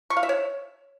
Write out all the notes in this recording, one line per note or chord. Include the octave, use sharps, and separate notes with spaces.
C#6
F5
E5
C#5